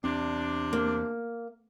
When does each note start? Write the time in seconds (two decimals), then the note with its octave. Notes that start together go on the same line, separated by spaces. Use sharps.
0.04 E2 C3 C4 D4
0.73 A#3